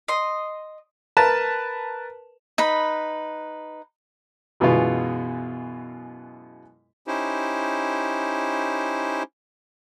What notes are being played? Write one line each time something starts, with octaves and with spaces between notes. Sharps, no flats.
D#5 C6
A#4 B4 A5
D#4 B4 B5
F#2 B2 E3 G#3 B3 F4
C#4 D#4 E4 G4 C5